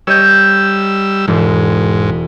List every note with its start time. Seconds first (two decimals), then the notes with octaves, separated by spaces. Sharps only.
0.07 G3 C#5 D#5 E6 G6
1.28 E1 G#2